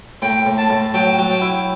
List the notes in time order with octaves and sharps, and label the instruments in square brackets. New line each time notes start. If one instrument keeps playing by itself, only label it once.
[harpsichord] A2 [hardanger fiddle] G5
[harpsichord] A2
[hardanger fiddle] A5
[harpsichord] A2
[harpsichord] F#3 [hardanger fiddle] G5
[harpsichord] F#3
[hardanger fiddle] G5
[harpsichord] E4